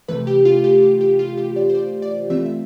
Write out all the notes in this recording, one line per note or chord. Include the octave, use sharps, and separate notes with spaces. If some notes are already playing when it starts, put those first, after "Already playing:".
C3 E3 A3 B4
G4
F4
G4
G4
G4
F4
G4
D5
C5
D5
D5
E3 A3 C4 F4 E5
E5